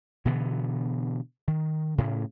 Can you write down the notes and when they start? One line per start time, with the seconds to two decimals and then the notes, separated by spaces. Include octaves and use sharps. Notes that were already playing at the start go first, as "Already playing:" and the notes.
0.25 B2 D3 E3 B3
1.48 D#3
1.98 A2 C#3